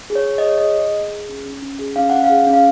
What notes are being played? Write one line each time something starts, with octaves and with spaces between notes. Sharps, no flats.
G#4
C#5
G#4
D#5
G#4 C#5
G#4 D#5
G#4
G#4
G#4
C#4
C#4
C#4
G#4
C#4 F5
C#4 F#5
F5
G#4
C#4
F5